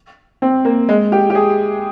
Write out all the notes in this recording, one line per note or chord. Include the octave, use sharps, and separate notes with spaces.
C4
A#3
G#3
G4
G4
G#4